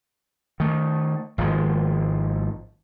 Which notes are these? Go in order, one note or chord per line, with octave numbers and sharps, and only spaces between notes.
D#3 A3
G#1 D#3 F3 G#3